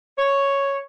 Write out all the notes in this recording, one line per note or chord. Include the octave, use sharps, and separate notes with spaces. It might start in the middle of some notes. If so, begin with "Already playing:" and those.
C#5